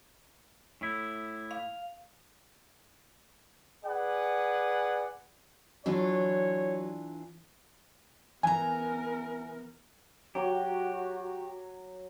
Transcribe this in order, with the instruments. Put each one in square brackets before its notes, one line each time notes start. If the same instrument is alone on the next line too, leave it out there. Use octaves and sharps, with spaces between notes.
[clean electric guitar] A2 E4
[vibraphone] F5
[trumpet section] G#4 B4 D5 F#5
[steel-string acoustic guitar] E3 D4 F4 [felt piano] F#3 [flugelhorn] C#5
[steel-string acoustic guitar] E3 A#5 [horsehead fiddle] B3 A#4 [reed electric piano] G#5
[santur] F#3 [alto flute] F#4 [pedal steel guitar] G4